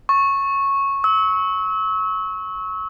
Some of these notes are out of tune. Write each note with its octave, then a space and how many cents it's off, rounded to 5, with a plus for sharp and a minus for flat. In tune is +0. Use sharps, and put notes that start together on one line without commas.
C#6 -10
E6 -30